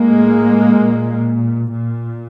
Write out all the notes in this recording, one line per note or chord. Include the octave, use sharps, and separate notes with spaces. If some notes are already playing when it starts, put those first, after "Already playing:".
Already playing: A2 G#3 A#3
A#2
A#2